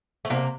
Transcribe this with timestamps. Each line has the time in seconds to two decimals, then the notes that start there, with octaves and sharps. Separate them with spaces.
0.25 A3
0.30 C3 A#3